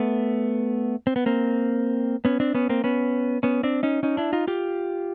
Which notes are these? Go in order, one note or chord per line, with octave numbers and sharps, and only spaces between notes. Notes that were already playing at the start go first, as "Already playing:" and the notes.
Already playing: A3 B3
C4
B3
A#3 C4
B3 C#4
C4 D4
B3 C#4
A#3 C4
B3 C#4
B3 C#4
C4 D4
C#4 D#4
C#4 D#4
D4 E4
D#4 F4
F4 G4